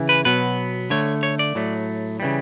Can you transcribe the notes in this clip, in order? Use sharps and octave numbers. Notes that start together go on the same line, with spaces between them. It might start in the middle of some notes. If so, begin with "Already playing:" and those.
Already playing: C#3 E3
B4
B2 F#3 B3 B4
D3 A3 C#5
C#5
D5
A2 F#3 A3
C#3 E3 G3